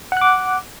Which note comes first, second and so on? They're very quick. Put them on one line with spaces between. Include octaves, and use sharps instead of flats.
F#5 F#6 D6